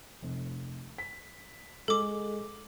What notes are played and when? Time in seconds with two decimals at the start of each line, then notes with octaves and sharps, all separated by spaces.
0.22 F1
0.98 B6
1.88 G#3 G#4 A4 D6